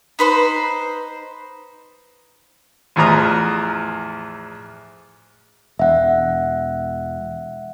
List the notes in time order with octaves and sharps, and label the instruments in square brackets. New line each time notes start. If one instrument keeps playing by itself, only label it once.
[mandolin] D#4 B4 C5
[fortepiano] A1 E2 F3 A#5 D#6
[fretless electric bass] E1 [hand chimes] E5 F#5